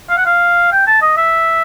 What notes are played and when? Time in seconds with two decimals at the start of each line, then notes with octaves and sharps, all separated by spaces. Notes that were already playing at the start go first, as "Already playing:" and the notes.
0.09 F5
0.17 F#5
0.26 F5
0.72 G5
0.87 A5
1.02 D#5
1.17 E5